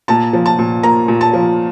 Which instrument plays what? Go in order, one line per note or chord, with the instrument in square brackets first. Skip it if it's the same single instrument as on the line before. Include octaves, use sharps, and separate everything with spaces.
[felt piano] A#2 A5
F3
A5
A#2
A#3 A#5
A#2
A5
F3